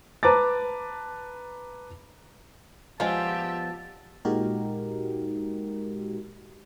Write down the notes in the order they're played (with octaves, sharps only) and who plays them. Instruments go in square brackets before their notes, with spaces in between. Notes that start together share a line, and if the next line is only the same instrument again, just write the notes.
[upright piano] B4 A5 A#5 D6 A6
[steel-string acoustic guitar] F3 G3 B3 [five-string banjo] G#3 F4 [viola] G4 E5 [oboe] A5
[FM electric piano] A#2 G#3 D#4 F#4 G4 A#4